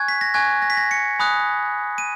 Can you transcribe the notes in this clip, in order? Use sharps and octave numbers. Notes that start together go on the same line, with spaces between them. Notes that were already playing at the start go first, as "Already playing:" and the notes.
Already playing: G#5 C#6 F#6 G#6
B6
A#6
G#5 C#6 F#6 G#6
A#6
B6
A#6
C#7
G#5 B5 D#6 F#6
D#7